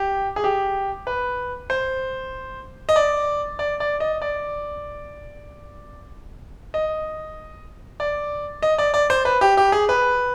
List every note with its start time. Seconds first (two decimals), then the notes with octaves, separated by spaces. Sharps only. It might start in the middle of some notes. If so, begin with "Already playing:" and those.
Already playing: G4
0.36 G#4
0.44 G4
1.07 B4
1.70 C5
2.89 D#5
2.96 D5
3.59 D5
3.80 D5
4.00 D#5
4.22 D5
6.74 D#5
8.00 D5
8.63 D#5
8.78 D5
8.94 D5
9.10 C5
9.25 B4
9.41 G4
9.57 G4
9.72 G#4
9.89 B4